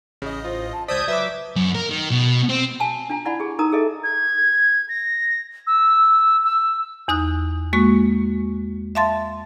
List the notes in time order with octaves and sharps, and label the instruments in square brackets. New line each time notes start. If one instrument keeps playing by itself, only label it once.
[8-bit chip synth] A1 D#5 [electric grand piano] C#3
[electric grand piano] F4 [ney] C5
[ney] A5
[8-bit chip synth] C#2 E6 B6 [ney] C5 [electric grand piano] D5 [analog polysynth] D#6 G6 G#6
[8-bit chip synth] F#3 [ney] B4 [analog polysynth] E5 D6
[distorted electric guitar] F#2
A#4
D#3
B2
C4
[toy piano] F#4 G#5 A5
D4 F4 G#5 A#5
E4 D5 F#5 G#5 B5
G4 G#4
D#4 A#4 A5 A#5 D#6
G#4 A4 D#5 E5
[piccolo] G#6
A#6
E6
E6
[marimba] E2 D#4 D#6 F#6
G#3 A#3 F#4 C#6
E5 F5 A5 C6 A6